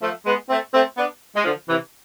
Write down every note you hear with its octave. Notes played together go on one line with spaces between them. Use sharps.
F3 A3
G#3 B3
A3 C4
A3 C4
B3 D4
G#3
D3 F3
C3 E3